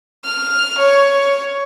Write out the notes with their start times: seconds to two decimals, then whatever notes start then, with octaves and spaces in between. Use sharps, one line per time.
0.25 F6
0.78 C#5